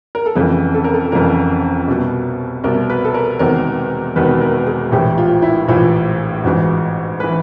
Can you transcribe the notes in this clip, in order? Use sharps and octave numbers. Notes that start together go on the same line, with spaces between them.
A#4
A4
F1 F2 C#3 E3 G#4
A4
A#4
A4
F1 F2 C#3 E3 A#4
C2 B2
C2 B2 A#4
B4
A4
A#4
E1 E2 C3 D#3 A#4
E1 E2 C3 D#3 B4
A#4
G#4
A#1 A2 E3 G4
F4
E4
A#1 A2 E3 F4
A1 G#2 E3 F#4
E3 B4